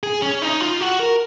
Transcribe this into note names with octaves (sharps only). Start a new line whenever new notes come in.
G#4
C#4
D#4
F4
F#4
A#4